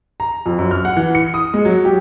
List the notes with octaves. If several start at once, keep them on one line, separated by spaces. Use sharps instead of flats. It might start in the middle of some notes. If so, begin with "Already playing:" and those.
A#5
F2
F#2
F6
F#5
E3
C#7
D#6
G#3
F#3
G4